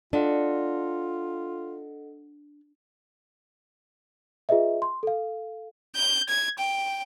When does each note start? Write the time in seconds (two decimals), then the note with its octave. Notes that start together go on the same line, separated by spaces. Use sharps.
0.13 D4 F4 A4 D#5 F#5
4.49 F4 G#4 B4 D#5 E5
4.82 C6
5.03 A4 F5
5.96 G6
6.29 G#6
6.58 G5